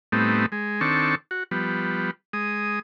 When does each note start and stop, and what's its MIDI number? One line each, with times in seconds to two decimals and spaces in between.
0.12 0.46 45
0.12 0.46 55
0.12 0.46 57
0.12 0.46 59
0.12 0.46 60
0.12 0.46 63
0.52 0.81 56
0.81 1.15 51
0.81 1.15 60
0.81 1.15 62
0.81 1.15 69
0.81 1.15 85
1.31 1.43 66
1.51 2.11 53
1.51 2.11 55
1.51 2.11 59
2.33 2.79 56
2.33 2.79 87